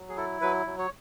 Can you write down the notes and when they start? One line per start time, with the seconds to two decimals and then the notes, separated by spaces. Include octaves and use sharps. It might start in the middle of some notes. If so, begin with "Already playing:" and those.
Already playing: F#3
0.09 G#4
0.17 E4 A4
0.41 F#3 B4
0.66 F#3
0.79 C#5